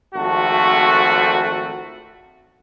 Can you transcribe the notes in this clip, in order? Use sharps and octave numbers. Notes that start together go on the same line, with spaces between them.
G#1 F2 A3 F#4 A4